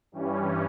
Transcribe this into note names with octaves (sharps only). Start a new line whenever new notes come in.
G2 E3 G3 C#4